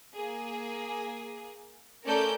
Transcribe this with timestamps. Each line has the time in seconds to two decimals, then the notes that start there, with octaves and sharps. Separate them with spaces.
0.14 A#3 G#4
2.05 A3 C#4 A4 A#4 D5 G6